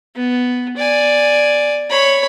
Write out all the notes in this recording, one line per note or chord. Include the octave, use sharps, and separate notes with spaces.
B3
D5 G#5
C#5 B5